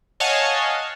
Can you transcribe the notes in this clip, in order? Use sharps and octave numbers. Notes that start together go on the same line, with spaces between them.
C#5 D#5 F5 F#5 G#5 A5